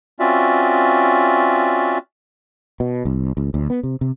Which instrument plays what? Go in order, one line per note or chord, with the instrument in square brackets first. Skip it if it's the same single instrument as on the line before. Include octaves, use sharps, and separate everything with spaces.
[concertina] C4 C#4 F4 F#4 D5 E5
[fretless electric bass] B2
C2
C#2
D2
B3
C3
C3